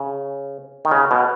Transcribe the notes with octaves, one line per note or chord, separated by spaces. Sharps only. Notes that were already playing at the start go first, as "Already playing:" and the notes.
Already playing: C#3
D#3
C#3
B2